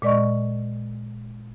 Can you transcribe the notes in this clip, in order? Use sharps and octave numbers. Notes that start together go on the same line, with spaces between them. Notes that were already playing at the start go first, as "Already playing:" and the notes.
A#2 G#3 D5 D#5 C#6